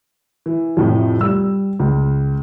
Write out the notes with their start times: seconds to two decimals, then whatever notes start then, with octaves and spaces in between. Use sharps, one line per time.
0.46 E3
0.77 F2 A2 C3 F3
1.20 G3 E6
1.79 C#2